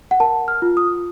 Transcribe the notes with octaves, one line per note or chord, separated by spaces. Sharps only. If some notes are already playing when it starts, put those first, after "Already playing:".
F#5
A#4 A5
F6
F4
D#6